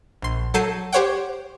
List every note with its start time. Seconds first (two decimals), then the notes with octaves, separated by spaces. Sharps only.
0.22 A#1 C6
0.54 F#3 A4 A5 G6 C7 D#7
0.93 G4 C5 C#5 F#5 G5